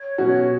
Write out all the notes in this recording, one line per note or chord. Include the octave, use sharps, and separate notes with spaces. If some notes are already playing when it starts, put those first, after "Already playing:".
Already playing: C#5
B2 F#3 C#4 F#4